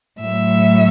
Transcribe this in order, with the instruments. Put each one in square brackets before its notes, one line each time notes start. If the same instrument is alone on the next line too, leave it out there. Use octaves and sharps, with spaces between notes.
[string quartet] A2 F#3 A3 E5